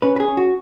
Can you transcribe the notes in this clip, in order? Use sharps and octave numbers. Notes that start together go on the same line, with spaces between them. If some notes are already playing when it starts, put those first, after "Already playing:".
C#4 B4
B4
G#4
C#4
F#4